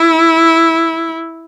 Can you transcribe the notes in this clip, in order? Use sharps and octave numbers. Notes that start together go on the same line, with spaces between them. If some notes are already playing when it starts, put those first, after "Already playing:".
Already playing: E4